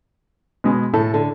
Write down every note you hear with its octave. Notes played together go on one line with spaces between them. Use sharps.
B2 G#3
A2 A4
D3